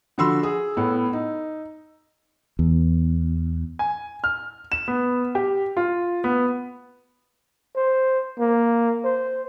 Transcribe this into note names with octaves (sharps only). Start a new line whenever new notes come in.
D3 F3 F#4 B5 C6 E6
G#4
A2 B3
D#4
E2
G#5
F6
E7
B3
G4
F4
B3
C5
A#3
C5